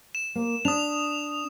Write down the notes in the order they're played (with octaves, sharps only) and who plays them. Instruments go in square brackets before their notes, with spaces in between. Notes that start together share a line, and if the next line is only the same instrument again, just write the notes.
[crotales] E7
[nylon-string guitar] A#3
[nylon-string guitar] D4 [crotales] D#6 F7